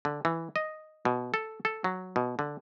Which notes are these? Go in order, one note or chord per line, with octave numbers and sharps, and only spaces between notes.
D3
E3
D#5
B2
A4
A4
F#3
B2
D3